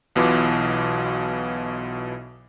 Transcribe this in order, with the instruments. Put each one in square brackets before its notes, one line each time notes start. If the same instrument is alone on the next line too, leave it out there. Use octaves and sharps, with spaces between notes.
[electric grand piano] B1 B2 E3 F4 D6